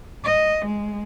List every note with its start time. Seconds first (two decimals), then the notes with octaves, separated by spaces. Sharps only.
0.24 D#5
0.66 G#3